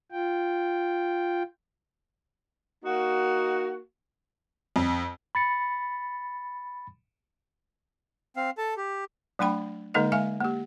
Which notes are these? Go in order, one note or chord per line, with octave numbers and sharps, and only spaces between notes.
F4 G5
A#3 D#4 F#4
F2
B5 A6 C#7
C4 F5
A4 A5
G4
F#3 A3 D4 G5 B5
D3 G#3 A#3 D#4 A4 D#5
G#3 E5 F5 G#5
A#3 G4